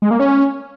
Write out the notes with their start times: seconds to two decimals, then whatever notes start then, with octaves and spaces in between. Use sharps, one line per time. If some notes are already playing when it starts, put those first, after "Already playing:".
0.02 G#3
0.11 A#3
0.19 C#4